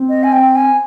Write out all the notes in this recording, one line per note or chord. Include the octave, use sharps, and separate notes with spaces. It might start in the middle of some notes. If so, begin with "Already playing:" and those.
Already playing: C4
D#5
G#5
G5
G#5